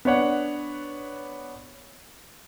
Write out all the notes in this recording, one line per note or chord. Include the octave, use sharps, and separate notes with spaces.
B3 D4 C#5 F#5